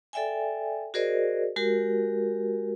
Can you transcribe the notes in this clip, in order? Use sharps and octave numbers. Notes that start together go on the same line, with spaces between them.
A4 D5 E5 G5 G#5
F#4 G#4 A#4 C5 D5 D#5
G#3 F#4 G4 A#4